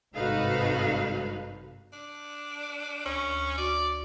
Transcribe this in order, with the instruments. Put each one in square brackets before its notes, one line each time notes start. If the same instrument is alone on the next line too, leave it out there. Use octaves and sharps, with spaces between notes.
[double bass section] G#1 G2 C3 [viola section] D#4 F#4 B4 [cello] A4 F5
[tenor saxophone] D4
[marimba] D2 [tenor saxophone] C#4
[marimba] F#4 [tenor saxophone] D5